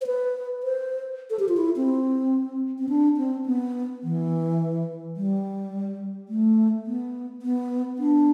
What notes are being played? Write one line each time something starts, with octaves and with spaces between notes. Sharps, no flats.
C5
B4
C5
A4
G4
F4
E4
C4
C4
D4
C4
B3
E3
G3
A3
B3
B3
D4